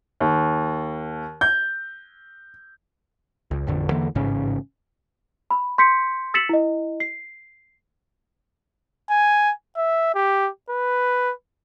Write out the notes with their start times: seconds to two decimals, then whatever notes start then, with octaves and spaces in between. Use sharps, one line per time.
0.20 D#2
1.41 G6
3.51 C#2
3.67 A1 F2 D3
3.90 E2 D3 E3 A#3
4.15 A1 G#2 C#3 C#4
5.51 B5
5.78 C6 G6 B6 C#7
6.34 E6 A6 B6 C#7 E7 F#7
6.49 E4 D#5
7.00 C7
9.10 G#5
9.77 E5
10.15 G4
10.70 B4